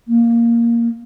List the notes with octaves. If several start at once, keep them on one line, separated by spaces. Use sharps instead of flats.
A#3